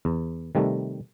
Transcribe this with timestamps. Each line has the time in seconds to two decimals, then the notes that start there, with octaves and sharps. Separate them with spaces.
0.05 E2
0.55 C3 D#3 G3 A3